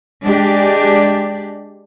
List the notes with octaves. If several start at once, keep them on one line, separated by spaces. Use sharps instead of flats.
G#3 D4 G4